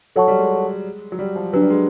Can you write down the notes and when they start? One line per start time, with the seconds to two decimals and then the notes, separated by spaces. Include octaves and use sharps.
0.16 F#3 A4 C#5 F#5 A5 C#6
0.28 G3
0.39 G#3
1.12 F#3
1.19 G3
1.36 F3
1.53 F#3 D4 G4 B4
1.62 G3
1.70 G#3